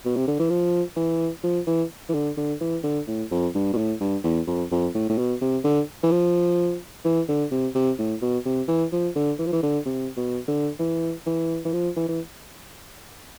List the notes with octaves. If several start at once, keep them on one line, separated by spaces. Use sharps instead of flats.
B2
C3
D3
E3
F3
E3
F3
E3
E3
D3
D3
E3
D3
A2
F2
G2
B2
A2
G2
E2
F2
F2
A2
A2
B2
C3
D3
E3
F3
E3
D3
C3
C3
A2
B2
C3
E3
F3
D3
E3
F3
E3
D3
C3
B2
D3
E3
E3
E3
F3
E3
E3